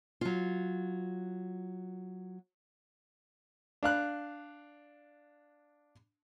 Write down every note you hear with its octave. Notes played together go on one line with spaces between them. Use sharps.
F#3 F4
D4 F5 F#6